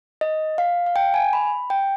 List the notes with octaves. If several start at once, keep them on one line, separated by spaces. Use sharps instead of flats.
D#5
F5
F5
G5
G#5
B5
G5